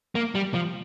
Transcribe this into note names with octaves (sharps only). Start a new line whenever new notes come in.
A#3
G3
F3